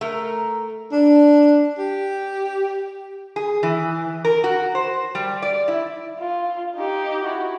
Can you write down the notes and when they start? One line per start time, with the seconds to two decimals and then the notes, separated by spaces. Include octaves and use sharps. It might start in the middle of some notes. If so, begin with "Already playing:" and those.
0.01 A3 A#4
0.92 D4
1.78 G4
3.36 G#4
3.63 E3
4.25 A#4
4.44 F#4
4.75 C5
5.15 G3
5.42 D5
5.68 E4
6.19 F4
6.76 D#4 G4
7.25 E4 F#4